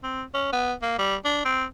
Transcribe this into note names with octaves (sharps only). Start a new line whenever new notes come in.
C4
C#4
B3
A#3
G3
D4
C4